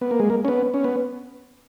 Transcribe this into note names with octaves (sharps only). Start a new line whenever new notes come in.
B3
A#3
G#3
A#3
C#4
B3
C#4
B3